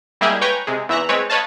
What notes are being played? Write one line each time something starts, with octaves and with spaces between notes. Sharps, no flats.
G3 G#3 A#3 E4 G4 G#4
B4 C#5 G5 G#5 A#5
C3 G#3
E2 E3 E5 A#5 F#6
G#3 C4 B4 C#5
B4 C#5 D#5 F5 A5